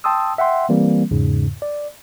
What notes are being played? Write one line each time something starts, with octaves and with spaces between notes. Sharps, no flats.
G5 A5 C6 D#6 E6
E5 F#5 G5 C6
E3 G3 A#3 C4
E2 G#2 C#3
D5